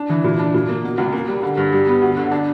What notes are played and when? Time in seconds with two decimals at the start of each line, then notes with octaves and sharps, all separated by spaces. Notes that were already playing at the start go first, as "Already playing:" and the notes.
Already playing: D4
0.10 E3
0.24 A#2
0.39 D4
0.54 A#2
0.69 A#3
0.83 B2
0.98 C#2
1.12 A#3
1.28 G3
1.43 D3
1.57 G2
1.72 G3
1.87 B3
2.02 D2
2.17 D3
2.31 D4